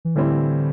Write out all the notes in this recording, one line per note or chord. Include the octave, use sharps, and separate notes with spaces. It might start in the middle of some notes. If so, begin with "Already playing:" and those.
E3
A2 D3 E3 G3 C4 E4